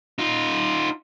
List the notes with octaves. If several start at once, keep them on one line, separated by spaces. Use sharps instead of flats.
D#4 F4